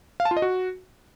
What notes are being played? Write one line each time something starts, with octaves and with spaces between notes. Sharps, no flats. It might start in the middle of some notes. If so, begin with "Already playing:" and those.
F5
A5
F4
D#5
F#4